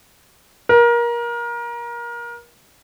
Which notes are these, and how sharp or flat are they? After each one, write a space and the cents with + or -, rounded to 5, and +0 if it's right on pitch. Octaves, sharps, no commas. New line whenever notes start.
A#4 +25